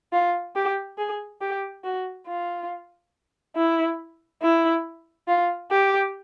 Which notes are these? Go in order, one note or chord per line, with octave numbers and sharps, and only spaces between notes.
F4
G4
G#4
G4
F#4
F4
E4
E4
F4
G4